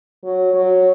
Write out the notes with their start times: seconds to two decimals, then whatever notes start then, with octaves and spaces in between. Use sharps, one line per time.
0.24 F#3
0.54 F#3